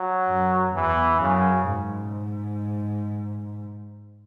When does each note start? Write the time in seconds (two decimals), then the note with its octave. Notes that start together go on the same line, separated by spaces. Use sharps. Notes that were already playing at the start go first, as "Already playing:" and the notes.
Already playing: F#3
0.28 F#2
0.74 E2 E3
1.20 F#2 C#3
1.67 G#2